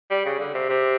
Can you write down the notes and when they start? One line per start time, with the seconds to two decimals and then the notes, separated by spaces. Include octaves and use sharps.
0.11 G3
0.26 C#3
0.40 D3
0.54 C3
0.69 C3